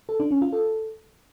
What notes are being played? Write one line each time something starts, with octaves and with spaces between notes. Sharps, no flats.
A4
D4
C#4
F4
A4